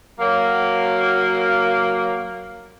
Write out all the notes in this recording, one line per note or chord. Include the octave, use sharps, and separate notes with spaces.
F#3 A#3